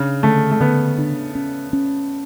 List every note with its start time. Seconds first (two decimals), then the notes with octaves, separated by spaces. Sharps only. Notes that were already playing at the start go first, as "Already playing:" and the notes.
Already playing: C#3 D4
0.23 D3 A3
0.51 A3
0.60 D3 B3
0.98 D4
1.35 C#4
1.73 C#4